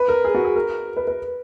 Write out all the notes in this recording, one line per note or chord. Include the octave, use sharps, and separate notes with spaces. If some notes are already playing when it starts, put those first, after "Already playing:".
Already playing: B4
A#4
G#4
F#4
G#4
A#4
B4
B4